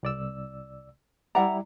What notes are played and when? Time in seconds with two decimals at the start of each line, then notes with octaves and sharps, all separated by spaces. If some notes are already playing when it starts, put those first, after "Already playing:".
0.03 C2 D5 E6
1.35 G3 E4 D5 E5 F#5 A#5